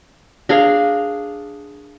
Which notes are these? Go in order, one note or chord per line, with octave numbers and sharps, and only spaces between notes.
D4 G#4 A#4 F5